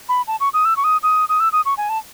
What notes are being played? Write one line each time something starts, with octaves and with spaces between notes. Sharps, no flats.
B5
A5
C#6
D#6
E6
C#6
D#6
D#6
D#6
E6
D#6
C#6
G#5
A5